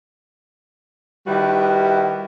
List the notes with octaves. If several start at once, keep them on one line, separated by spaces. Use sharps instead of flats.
D#3 G3 E4 F#4 G4 B4